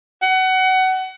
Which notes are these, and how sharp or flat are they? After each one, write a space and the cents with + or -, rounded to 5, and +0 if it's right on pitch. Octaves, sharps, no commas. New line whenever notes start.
F#5 +25